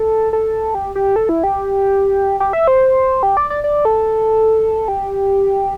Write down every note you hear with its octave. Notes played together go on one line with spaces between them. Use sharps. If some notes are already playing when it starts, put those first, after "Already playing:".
Already playing: A4
A4
G4
G4
A4
E4
G4
G4
E5
C5
G4
D5
D5
D5
A4
G4